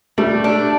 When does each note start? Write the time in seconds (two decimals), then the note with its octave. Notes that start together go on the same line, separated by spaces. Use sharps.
0.18 G3 A3
0.44 D4